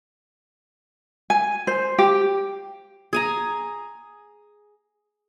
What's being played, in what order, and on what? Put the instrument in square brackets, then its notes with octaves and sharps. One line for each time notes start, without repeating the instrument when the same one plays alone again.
[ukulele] G#5
C5
G4
[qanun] G#4 G#5 A#5